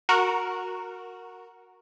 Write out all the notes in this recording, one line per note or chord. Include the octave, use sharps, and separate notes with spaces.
F#4 A#4